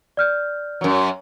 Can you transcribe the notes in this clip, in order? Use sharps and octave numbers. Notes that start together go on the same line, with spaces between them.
D5 F6 G6
F#2 F#3